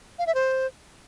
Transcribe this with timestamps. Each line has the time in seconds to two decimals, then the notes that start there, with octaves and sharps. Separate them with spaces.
0.19 F5
0.27 E5
0.35 C5